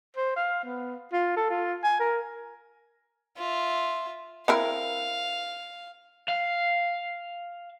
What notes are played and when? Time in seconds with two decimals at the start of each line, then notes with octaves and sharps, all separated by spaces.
0.17 C5
0.36 F5
0.64 B3
1.13 F4
1.37 A4
1.50 F4
1.84 G#5
2.00 A#4
3.37 F4 E5
4.48 C4 E4 A#4 F5
6.28 F5